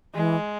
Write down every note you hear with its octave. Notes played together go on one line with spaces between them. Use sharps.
E3 G#3